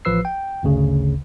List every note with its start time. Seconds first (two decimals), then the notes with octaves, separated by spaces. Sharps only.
0.05 A1 F3 B4 E6 C7
0.25 G5
0.63 G1 D2 C#3